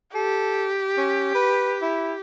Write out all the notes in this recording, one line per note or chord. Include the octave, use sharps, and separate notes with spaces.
G4 A4
C#4
B4
E4